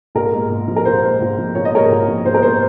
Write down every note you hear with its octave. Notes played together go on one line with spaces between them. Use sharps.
A#1 A#4
G#2
A#1
F3
A#4
A#1 C5
G#2
A#1
F3
A#1 C#5
D#5
G#2 A#4 C#5
A#1
F3
A#1 C5
A#4
G#2 C5